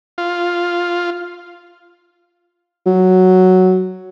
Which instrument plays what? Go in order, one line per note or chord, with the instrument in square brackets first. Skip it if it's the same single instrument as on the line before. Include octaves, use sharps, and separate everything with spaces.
[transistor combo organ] F4
[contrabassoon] F#3